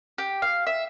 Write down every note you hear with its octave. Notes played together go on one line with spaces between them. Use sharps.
G4
F5
E5